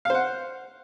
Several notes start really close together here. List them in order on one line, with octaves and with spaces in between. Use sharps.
F5 C5 F#5